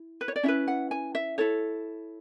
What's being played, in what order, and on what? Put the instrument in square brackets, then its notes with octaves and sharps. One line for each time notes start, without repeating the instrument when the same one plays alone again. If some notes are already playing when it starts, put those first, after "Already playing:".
Already playing: [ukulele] E4
B4
C#5
D5
C#4 E4 B4 E5
F#5
G#5
E5
E4 A4 C#5